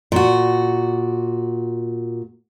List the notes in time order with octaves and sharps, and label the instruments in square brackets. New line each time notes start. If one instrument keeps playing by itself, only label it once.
[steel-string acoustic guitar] A#2 F#4